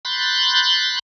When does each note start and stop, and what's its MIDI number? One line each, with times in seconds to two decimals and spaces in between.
0.05 0.99 83
0.05 0.99 84
0.05 0.99 90
0.05 0.99 91
0.05 0.99 93